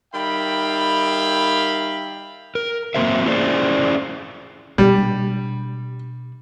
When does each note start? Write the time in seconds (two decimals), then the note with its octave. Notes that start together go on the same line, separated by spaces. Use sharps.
0.13 D#3 G3 E5 F5 G5 B5
2.55 A#4
2.95 F#3 A#3 C4 C5 E5
3.26 C#4 E4 G#4 C5 D5
4.78 B2 G3 D4